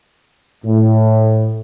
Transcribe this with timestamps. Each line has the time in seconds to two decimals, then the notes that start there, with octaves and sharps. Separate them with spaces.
0.65 A2